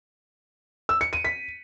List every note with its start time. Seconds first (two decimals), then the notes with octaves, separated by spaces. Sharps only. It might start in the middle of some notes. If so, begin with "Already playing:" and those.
0.89 E6
1.01 C#7
1.13 D#7
1.24 B6